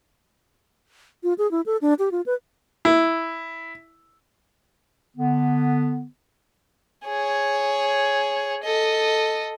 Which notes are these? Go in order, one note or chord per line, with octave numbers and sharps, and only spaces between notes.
F4
G#4
E4
A4
D4
G4
F4
B4
E4
D3 B3
G#4 C#5
A4 D#5